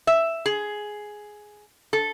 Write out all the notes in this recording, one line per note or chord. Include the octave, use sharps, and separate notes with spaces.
E5
G#4
A4